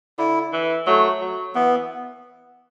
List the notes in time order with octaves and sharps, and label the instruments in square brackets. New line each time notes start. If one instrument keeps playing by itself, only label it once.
[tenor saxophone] D3 [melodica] E4
[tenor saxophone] E3
[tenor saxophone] F#3 [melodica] A3
[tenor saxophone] F#3
[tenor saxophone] E3 [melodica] B3